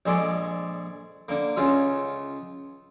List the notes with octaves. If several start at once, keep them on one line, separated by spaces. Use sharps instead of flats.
A#1 G#3 A4 D5
D3 A#3
C#2 C#3 F4 E5